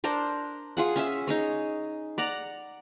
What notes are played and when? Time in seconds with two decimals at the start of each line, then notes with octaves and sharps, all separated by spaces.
0.04 D4 A#4 C5
0.77 F4 G#4 F#5
0.96 C#4 G#4 E5
1.27 D#4 G#4 C#5
2.18 D5 F#5 A#5